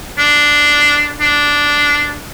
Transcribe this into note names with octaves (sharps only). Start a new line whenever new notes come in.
D4
D4